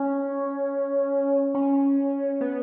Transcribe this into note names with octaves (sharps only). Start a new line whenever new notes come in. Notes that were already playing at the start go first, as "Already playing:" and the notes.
Already playing: C#4
C#4
B3